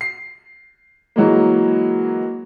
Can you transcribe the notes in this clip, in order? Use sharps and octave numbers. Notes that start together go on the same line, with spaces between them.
C7
E3 F#3 G#3 A#3